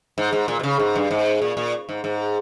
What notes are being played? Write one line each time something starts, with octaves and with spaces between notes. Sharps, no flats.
G#2
G#2
A#2
B2
C#3
G#2
G2
G#2
A#2
A#2
G#2
G#2